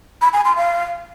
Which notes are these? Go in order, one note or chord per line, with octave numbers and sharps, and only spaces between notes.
B5
G#5
C6
F5